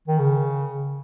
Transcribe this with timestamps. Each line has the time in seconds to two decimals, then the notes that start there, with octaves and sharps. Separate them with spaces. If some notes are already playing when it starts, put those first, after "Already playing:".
0.08 D#3
0.19 C#3